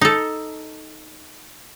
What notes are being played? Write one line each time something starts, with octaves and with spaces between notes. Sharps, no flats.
D#4 A4